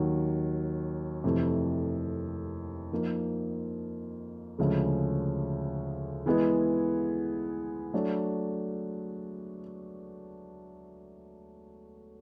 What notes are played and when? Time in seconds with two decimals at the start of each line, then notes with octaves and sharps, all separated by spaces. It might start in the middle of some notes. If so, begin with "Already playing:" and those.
Already playing: D#2 D#3 F#3
1.24 F2 C3 E3 A3
2.92 F3 A#3 D#4
4.59 D2 C#3 F3 G#3
6.26 E3 G#3 B3 E4 G#4
7.94 F#3 A3 D4